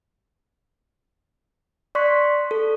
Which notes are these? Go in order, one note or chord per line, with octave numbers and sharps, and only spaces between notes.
D5 C6 C#6 F#6 B6
A4